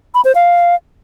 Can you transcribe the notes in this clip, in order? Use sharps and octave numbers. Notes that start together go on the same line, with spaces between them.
B5
C5
F5